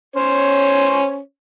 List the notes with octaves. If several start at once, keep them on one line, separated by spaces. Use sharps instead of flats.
C#4 C5 C#5